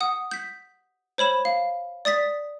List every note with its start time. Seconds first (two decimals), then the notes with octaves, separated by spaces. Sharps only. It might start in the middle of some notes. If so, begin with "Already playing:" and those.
0.01 F#5 D#6
0.31 G6 B6
1.18 C5 C#5 B5 E7
1.45 F5
2.05 D5 D#6 A6 B6